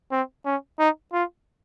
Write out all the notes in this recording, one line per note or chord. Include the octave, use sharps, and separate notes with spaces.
C4
C#4
D#4
F4